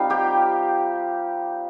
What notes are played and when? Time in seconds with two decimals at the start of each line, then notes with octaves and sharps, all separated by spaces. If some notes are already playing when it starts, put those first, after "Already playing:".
Already playing: G3 C4 D#4 F4 F5
0.10 G4 G5